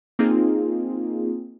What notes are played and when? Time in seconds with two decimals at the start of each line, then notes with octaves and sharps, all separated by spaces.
0.19 A#3 C4 D#4 F4 G#4